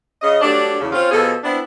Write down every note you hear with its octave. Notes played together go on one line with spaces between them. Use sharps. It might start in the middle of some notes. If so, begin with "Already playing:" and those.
C#3 D#5
F#3 G3 A3 D4
E2 C#3
C4 C#4 F4
B2 F3 G#4 A4
B3 C4 D4 E4